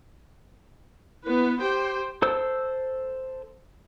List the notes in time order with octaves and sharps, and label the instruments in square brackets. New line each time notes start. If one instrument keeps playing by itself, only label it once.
[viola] B3 B4 [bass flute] E4
[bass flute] G4 [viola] C5 G5
[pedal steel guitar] A4 C5 E6